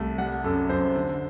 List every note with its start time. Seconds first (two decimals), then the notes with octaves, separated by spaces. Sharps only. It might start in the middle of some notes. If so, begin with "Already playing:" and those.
Already playing: C2 A3
0.18 G3 F#5
0.44 F#2 A4
0.69 F#2 C5
0.95 D3